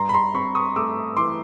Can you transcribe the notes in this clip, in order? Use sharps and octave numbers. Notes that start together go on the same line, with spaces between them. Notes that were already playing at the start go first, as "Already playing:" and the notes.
Already playing: G2 A#5 C6
B5
A#5 C6
C4 B5 C#6
C#6 D#6
A3 D6 E6
E3 C6 D6